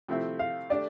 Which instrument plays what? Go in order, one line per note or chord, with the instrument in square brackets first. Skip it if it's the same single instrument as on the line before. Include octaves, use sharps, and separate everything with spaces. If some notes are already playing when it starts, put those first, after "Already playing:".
[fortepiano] C3 F3 A3 C4 E4
[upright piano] F5
[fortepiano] A3 D4 G4 [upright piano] D5